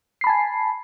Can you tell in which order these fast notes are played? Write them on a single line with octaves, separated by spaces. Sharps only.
C7 B5 A5 G#5